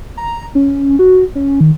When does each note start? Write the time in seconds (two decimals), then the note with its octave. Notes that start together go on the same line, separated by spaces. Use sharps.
0.17 A#5
0.55 C#4
0.99 F#4
1.35 C#4
1.61 D#3